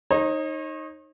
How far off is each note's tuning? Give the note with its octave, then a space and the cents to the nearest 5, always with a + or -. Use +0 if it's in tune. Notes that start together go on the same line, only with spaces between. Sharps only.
D#4 +0 C#5 -40 A#5 -10